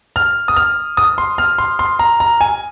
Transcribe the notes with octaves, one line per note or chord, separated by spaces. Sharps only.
F6
D#6
F6
D#6
C6
F6
C6
C6
A#5
A#5
G#5